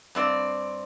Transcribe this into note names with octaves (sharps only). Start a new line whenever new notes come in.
G2 C4 D5